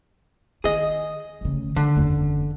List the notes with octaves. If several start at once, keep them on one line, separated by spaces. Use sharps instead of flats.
D#3 G#4 D#5
D2 C#3
D3 D#3
F#1 E2